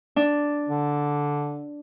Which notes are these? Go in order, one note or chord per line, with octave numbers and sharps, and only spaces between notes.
D4
D3